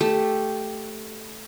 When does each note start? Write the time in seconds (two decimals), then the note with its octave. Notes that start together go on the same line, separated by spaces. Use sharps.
0.01 A3 G4 A5